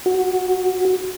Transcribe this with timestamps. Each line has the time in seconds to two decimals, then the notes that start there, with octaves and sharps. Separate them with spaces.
0.06 F#4